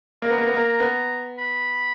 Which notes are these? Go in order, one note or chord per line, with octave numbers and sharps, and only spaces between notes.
A#3 A#5
B3
A#3
B3
A#3
B3
B5